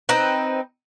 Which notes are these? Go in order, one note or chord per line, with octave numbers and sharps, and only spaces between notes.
C4 D#4 B4